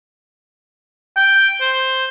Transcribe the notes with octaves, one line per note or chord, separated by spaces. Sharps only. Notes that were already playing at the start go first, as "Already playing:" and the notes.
G5
C5